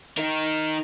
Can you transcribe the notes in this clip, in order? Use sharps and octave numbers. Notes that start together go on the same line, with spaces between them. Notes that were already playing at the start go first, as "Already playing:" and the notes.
D#4 A#4